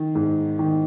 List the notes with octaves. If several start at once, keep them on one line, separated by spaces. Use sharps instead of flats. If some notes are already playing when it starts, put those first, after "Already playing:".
Already playing: D#3
G#2
D#3